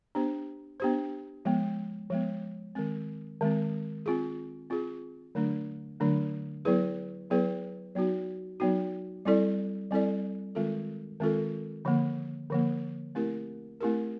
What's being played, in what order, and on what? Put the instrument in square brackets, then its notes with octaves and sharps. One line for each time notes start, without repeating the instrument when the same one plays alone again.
[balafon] B3 D4 G4 C5
B3 D4 G4 C5
F3 G#3 B3
F3 G#3 B3
D#3 G#3 C4
D#3 G#3 C4
C4 F4 G#4
C4 F4 G#4
D3 F#3 A3 D4
D3 F#3 A3 D4
F#3 B3 E4 G#4 B4
F#3 B3 E4 G#4 B4
F#3 B3 D#4 F#4
F#3 B3 D#4 F#4
G3 C4 E4 A4 D5
G3 C4 E4 A4 D5
D#3 G#3 C4 F4 A4
D#3 G#3 C4 F4 A4
D3 F3 A#3
D3 F3 A#3
A3 C4 E4 G4 A#4
A3 C4 E4 G4 A#4